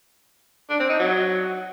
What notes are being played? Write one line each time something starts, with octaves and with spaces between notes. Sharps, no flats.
D4
C4
D#4
F#3